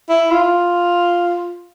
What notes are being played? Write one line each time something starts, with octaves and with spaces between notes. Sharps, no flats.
E4
F4